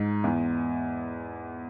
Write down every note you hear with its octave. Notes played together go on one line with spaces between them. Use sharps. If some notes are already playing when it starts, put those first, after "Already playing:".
Already playing: G#2
E2